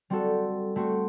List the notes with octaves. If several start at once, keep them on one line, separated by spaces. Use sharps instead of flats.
G3 C4 F#4 A4
A3 C4 F#4